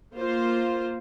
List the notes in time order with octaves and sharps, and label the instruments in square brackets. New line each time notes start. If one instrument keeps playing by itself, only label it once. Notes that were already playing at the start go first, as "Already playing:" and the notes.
[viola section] A#3 F4 C5